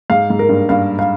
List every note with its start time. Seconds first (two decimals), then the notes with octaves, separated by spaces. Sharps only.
0.10 G#2 F5
0.30 G#2
0.39 A#4
0.49 G2
0.69 G2 F5
0.99 F5